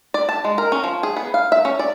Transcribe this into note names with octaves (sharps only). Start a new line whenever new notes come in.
D5
A5
G#3
A#4
C#4
F3
G#4
B3
F5
E5
C#4
D5